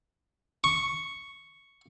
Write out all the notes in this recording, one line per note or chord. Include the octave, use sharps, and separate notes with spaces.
C#6